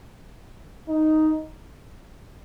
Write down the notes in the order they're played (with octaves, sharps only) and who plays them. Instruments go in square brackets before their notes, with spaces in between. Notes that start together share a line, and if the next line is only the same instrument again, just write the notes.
[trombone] D#4